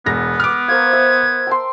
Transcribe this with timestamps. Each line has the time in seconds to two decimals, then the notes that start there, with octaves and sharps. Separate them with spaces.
0.06 E1 B3 A#6
0.40 D6 F6
0.68 A#4 C5 F5 G#6
0.93 E5
1.47 G5 A5 C6